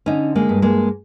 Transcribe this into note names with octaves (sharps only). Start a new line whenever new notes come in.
D3 C#4 D#4
G#3 A#3
G2
G#3 A#3